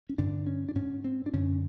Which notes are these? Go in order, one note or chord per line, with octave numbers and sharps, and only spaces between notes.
C#4
G2 D3 D4
C#4
D4
G#2 C#4
C4
D4
F#2 D3 C#4